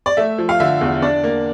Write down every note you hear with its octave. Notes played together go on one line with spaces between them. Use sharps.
D5
A3 E5
F3
F5
D3 E5
E2
D4 D5
A#3